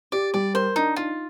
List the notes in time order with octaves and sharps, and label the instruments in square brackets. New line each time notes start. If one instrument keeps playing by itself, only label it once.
[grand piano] G4 [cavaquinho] D5
[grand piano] G3 [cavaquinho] D5
[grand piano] A#4 [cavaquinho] C5
[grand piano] D4 [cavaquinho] D#4
[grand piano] D#4 [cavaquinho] F4